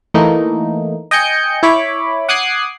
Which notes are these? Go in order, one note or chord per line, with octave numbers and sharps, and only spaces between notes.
E3 A3 A#3 D#4
D#5 G5 G#5 G6 C#7
E4 C#5 B5 D6
F#5 D6 D#6 F#6 G#6 C7